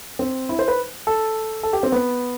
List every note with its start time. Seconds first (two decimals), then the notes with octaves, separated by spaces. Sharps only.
0.19 C4
0.49 E4
0.59 C5
0.68 B4
1.07 A4
1.63 A4
1.73 G4
1.83 C4
1.92 B3